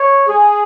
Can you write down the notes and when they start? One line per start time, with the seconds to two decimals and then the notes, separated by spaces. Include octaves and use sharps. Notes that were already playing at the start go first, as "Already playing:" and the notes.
Already playing: C#5
0.28 G#4